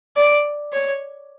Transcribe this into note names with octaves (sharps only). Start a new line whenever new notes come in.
D5
C#5